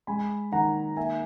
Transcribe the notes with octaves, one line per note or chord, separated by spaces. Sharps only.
G#3 G#5 B5
D#3 F#5 A#5
A#3 E5 G#5